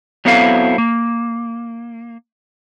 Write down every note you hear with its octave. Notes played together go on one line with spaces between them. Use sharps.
F#3 B3 C4 E4 A4 F5
A#3